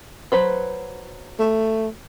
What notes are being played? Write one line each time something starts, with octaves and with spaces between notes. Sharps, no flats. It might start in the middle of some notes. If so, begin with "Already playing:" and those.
F#3 B4 C5
A3